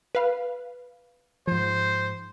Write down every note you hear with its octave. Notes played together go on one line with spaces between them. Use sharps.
B4 F5
G#2 F3 C5